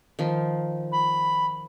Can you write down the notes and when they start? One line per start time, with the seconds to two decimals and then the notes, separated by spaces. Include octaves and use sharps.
0.19 D#3 F3
0.92 B5